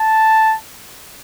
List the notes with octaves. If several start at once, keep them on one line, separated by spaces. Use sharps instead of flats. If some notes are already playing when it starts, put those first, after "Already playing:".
Already playing: A5